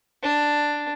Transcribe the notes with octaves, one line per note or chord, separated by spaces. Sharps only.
D4